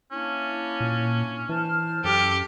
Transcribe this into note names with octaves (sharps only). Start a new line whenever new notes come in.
A#3 C#4 D4 E4
A#2
E3 C5 A5 F6
F#2 G4 A4